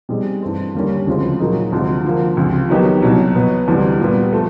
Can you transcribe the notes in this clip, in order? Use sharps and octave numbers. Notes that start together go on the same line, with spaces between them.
B2 G3 C4 D#4 G#4
G2 E3 A3 C4
D#2 D3 G3 A#3 C#4
D2 C#3 F3 G#3 C4
A#2 F#3 A#3 D#4 G#4
D2 C3 F3 G#3
D3 F3 A#3
C#2 C3 F3
D#3 F#3 B3 D#4 G4
C2 B2 F#3
B2 F#3 B3
D2 C3 E3 G3
A#2 G3 B3
F3 A3